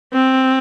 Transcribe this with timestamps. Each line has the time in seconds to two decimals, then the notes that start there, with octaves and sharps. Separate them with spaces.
0.13 C4